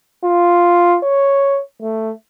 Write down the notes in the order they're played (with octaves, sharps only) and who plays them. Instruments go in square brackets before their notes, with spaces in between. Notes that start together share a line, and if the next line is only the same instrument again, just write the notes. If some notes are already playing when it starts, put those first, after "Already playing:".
[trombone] F4
C#5
A3